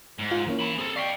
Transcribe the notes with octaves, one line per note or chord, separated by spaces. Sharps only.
G#2
F4
E3 A#3 C#4
G#5 B5
C4 G#4 A4
D5 F5 G5 C#6 B6